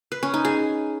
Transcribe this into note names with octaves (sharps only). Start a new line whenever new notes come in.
B4
C#4
D#4
G#4